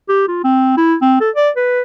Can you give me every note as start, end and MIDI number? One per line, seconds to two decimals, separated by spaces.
0.09 0.28 67
0.28 0.44 65
0.44 0.74 60
0.77 0.95 64
1.01 1.17 60
1.21 1.30 69
1.35 1.50 74
1.56 1.82 71